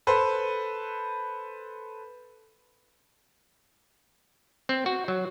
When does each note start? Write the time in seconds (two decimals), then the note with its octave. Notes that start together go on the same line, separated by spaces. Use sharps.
0.07 A4 B4 C5
4.69 C4
4.86 F#4
5.08 F#3